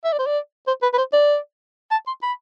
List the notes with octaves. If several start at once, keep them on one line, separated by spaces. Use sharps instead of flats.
E5
D5
C5
D5
C5
B4
B4
C5
D5
A5
C6
B5